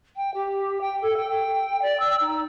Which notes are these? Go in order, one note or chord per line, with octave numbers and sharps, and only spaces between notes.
G5
G4
G5
A4
G5
D5
E6
D#4